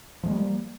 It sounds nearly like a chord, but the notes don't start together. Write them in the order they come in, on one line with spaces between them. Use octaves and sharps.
F3 G#3 A#3 G3